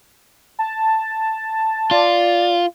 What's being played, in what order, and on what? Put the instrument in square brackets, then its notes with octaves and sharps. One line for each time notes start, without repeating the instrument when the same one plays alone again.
[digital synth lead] A5
[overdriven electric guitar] F4 [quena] D5